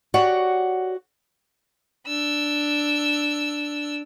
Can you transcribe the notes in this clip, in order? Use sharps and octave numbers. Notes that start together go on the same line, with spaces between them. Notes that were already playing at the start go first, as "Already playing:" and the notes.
F#4 G4 C#5 D5 F#5
D4 E6